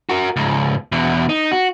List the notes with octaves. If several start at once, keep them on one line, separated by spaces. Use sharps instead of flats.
F#4 A#4
C#2 G#2
E2 B2
D#4
F#4